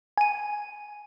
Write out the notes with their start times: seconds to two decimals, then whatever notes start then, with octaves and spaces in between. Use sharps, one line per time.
0.18 G#5 D#7